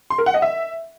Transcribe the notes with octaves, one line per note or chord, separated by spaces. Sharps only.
C6
A#4
F#5
D#5
E5